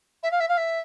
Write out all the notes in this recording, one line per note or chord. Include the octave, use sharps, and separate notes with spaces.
E5
F5
E5
F5
E5